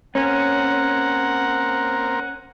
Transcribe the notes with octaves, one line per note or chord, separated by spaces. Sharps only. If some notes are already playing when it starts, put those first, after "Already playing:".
A#3 C4 C#4 A#4 F#5